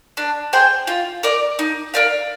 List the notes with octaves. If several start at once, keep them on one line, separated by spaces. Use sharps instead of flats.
D4
G#4 C5 G5
F4
A#4 D5
D#4
A#4 D5 F5